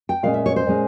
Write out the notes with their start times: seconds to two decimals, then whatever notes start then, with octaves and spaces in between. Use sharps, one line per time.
0.09 G5
0.23 A#2 G#3 C#4 F5
0.34 E5
0.46 C#5
0.56 C5
0.66 A#2 G#3 C#4